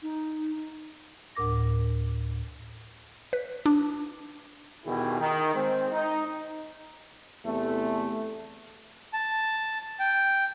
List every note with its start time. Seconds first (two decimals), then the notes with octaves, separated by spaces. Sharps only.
0.02 D#4
1.35 D2 A2 A#4 D6 A#6
3.33 B4
3.66 D4
4.85 E2 B2 D#3 E4 G4 G#4
5.19 D#3
5.54 G#3 C4
5.92 D#4
7.46 E2 C3 A3
9.13 A5
10.00 G5